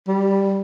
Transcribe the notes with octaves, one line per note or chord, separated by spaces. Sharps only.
G3